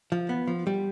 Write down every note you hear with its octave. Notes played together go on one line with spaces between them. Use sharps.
F3
B3
F3
G3